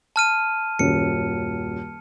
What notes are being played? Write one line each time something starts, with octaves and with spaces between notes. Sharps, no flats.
A5 F6 D#7
D#1 F#2 C#7